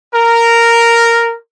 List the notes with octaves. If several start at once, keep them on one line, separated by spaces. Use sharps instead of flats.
A#4